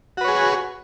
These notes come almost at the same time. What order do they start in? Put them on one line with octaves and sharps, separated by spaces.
F#4 B4 C#5 G#4